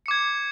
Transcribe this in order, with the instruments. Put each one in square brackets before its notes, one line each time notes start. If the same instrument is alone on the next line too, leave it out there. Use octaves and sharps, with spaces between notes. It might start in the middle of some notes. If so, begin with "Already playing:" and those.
[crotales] C#7
D6
G#6